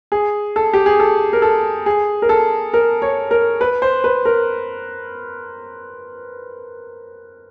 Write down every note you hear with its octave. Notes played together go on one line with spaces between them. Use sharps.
G#4
A4
G4
G#4
A4
A#4
A4
G#4
A#4
A4
A#4
C#5
A#4
B4
C5
B4
A#4